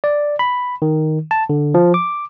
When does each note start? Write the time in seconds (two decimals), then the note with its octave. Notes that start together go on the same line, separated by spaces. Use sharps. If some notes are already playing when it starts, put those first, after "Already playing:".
0.04 D5
0.39 B5
0.82 D#3
1.31 A5
1.50 D3
1.74 F3
1.94 D6